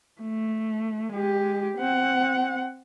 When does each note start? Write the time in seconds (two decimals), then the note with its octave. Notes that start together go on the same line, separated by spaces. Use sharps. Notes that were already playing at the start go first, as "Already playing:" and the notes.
0.21 A3
1.12 G#3 G4
1.78 C4 F#5